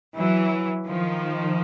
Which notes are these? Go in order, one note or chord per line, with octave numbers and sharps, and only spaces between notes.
E3 F#3
D#3 F3